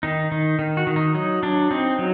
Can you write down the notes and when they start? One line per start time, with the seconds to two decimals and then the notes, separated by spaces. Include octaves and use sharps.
0.03 D#3 D#4
0.32 D#3 D#4
0.59 D#3
0.77 F#4
0.87 D#3
0.96 D#4
1.15 F#3 D#4
1.43 F#3 D4
1.71 C4 D#4
1.99 F#3